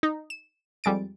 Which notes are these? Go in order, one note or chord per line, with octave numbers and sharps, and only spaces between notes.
D#4
E7
F2 G3 G#3 A6 D7